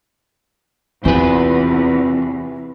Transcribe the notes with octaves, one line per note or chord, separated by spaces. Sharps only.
E2 C3 E3 C4 F4 B4